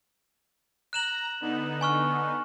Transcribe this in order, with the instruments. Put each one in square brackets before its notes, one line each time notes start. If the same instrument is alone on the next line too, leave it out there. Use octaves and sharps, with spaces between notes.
[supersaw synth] A#5 [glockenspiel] F#6 E7 F#7
[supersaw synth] D3 B3 D#4
[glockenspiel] G#5 C#6 F6